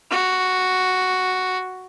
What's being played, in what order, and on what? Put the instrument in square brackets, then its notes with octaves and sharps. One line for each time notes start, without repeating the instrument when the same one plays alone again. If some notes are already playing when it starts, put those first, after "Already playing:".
[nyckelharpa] F#4